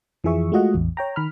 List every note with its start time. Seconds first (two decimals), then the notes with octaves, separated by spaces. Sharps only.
0.24 F2 E3 F3 G#4 E5 C#6
0.52 G#3 A3 F4 F#4 D#5 F#5
0.74 A1 E2
0.97 C#5 G5 A#5
1.16 D#3 B5 F6